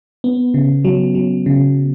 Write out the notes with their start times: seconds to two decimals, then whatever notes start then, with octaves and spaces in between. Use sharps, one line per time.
0.24 B3
0.54 C#3
0.85 F#3
1.15 F#3
1.46 C#3